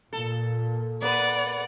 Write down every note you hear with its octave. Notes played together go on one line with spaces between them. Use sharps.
A#2 A4
A#3 B4 D5 F#5